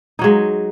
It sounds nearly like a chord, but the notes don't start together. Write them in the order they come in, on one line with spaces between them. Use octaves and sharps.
D#4 F#3 G#3